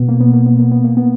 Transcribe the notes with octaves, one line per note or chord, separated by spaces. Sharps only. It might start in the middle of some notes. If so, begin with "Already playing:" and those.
Already playing: B2 B3
A#3
B3
A#3
B3
A#3
B3
A#3
B3